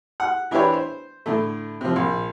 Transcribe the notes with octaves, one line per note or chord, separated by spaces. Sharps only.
F#5
E3 D4 E4 G4 B4 C#5
C5
A2 D3 A3
C3 F3
A#1